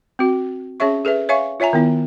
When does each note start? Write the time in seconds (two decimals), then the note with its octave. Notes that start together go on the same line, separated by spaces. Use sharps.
0.19 C4 F#4
0.80 C#4 G#4 C#5 E5 C#6
1.05 G#4 A4 B4 E5
1.29 C#5 E5 F5 G#5 C#6
1.60 F4 C#5 E5 G#5 A#5
1.73 D#3 B3 E4